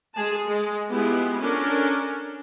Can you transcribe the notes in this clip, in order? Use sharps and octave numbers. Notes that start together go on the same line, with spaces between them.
G#3 G#4 A5
G#3
G#3 B3 E4 F4 G4
C#4 D4 A4 A#4